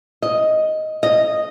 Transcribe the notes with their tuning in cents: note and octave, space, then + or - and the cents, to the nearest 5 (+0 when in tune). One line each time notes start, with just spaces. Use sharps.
D#5 +5
D#5 -5